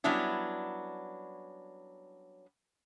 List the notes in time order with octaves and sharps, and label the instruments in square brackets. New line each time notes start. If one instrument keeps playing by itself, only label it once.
[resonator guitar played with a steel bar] F#3 G3 B3 C#4 D4 E4